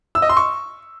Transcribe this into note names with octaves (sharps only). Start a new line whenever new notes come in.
E6
D#5
C6
C#6